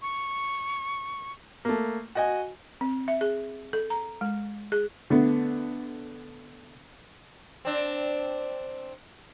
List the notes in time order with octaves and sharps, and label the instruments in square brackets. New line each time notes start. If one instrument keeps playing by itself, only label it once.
[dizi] C#6
[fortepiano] A3 A#3
F#4 D#5 G#5
[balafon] C4
E5
G#4
A4
A#5
G#3
G#4
[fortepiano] D3 A3 B3
[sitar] C4 D4